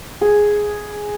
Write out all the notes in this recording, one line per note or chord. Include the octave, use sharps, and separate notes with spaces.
G#4